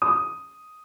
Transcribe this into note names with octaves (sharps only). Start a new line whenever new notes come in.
D#6